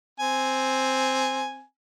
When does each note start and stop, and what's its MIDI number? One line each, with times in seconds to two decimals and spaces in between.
0.20 1.63 60
0.20 1.63 80